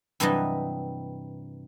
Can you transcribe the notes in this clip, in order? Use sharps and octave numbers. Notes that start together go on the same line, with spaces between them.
G2 C3 E3 F#3 G3 D#5